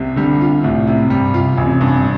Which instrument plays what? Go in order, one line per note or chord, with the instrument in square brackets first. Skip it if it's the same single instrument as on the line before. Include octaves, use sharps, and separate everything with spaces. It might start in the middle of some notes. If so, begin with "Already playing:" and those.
Already playing: [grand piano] C2 C3
[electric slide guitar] D3 [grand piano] G3
[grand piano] F4
[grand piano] C2 [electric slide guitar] A2
[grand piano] C3
[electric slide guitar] G2 [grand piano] G3
[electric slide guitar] C3 [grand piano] F4
[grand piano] A1 [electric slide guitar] C3
[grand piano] G2